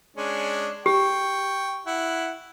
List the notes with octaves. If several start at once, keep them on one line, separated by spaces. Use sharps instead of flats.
G#3 C#4 D4
G4 G5 C#6
E4 F#5